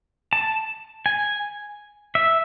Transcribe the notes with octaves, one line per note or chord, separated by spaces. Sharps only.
A5
G#5
E5